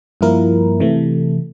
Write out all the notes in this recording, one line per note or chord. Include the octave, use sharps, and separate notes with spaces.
G2 F3 A#3 E4 A#4
C3 E3 A3